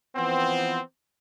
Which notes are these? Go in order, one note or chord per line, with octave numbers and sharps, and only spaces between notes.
E3 F3 B3 C4